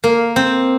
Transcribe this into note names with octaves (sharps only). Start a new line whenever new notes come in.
A#3
C4